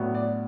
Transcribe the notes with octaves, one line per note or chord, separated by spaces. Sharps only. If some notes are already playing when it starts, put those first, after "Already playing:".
Already playing: A2 F#3 B3 D4
D5